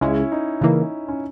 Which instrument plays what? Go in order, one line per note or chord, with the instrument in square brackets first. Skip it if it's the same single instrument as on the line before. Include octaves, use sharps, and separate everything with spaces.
[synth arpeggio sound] C#2 C#3 G#3 [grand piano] C#4 E4
[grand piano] D#4
[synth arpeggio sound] C#3 E3 A#3 [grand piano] D#4
[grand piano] C#4